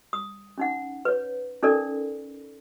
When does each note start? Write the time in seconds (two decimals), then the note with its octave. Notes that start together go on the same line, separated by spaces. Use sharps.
0.13 D#6
0.58 C#4 D#4 F#5
1.05 B4 C#5
1.63 C#4 D#4 A4 A#4 D5